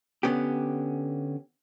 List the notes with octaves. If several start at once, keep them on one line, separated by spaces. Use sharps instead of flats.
D3 B3 C#4 G4